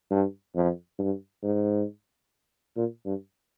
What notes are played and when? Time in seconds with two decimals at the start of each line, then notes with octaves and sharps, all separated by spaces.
0.10 G2
0.55 F2
0.99 G2
1.43 G#2
2.76 A#2
3.05 G2